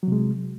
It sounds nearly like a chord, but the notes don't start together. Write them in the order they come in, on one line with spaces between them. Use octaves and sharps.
F#3 C3 G#3